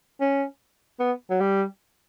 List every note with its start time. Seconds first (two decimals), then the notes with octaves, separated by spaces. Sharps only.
0.21 C#4
0.99 B3
1.30 F#3
1.40 G3